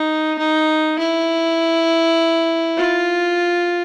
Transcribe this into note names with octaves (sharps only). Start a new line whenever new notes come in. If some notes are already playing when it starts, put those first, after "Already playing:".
Already playing: D#4
D#4
E4
F4